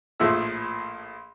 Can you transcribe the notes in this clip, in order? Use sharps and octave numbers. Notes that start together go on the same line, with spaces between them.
A#1 A2 F3 G#4 E5 E6